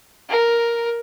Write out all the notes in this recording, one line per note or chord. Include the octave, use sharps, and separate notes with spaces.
A#4